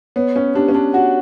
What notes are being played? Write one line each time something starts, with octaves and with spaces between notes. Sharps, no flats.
B3 C#5
C#4
D4 G4
C#4
D4
F#4 F#5